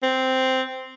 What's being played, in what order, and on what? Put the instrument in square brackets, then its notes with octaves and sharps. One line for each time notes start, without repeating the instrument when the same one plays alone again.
[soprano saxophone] C4